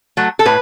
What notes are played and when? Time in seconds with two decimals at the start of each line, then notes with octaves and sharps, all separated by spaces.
0.17 F#3 A3
0.39 A4
0.45 A2 B4